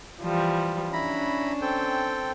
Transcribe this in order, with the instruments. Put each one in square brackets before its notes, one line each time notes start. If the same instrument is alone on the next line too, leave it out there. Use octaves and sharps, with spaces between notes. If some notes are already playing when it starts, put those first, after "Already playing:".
[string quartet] E3 F3 G3
[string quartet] C#4 D4 [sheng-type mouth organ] E4 A#5 B5
[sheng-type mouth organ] C4 A4 G5